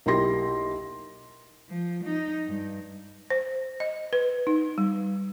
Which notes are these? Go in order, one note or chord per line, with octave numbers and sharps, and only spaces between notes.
B1 A#3 E4 G4 C6 A#6
F3
D#4
G2
C5
D#5
B4
D#4
G3